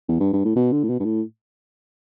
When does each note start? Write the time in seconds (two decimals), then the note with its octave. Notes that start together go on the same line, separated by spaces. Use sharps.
0.08 E2
0.20 G2
0.33 G2
0.45 A2
0.56 B2
0.72 D3
0.83 A2
0.89 B2
1.00 G2
1.05 A2